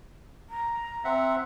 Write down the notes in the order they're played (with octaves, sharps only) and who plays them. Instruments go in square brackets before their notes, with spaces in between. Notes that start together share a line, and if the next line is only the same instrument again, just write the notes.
[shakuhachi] A#5
[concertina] C4 E5 F#5